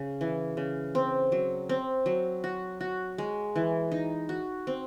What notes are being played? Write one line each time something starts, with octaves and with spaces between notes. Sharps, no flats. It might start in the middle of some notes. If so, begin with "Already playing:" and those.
Already playing: C#3
E3
C#3
C4
F#3
C4
F#3
F#4
F#4
G#3
E3
D#4
F#4
C4